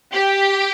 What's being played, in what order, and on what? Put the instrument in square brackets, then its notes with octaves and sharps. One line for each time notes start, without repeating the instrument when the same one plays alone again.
[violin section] G4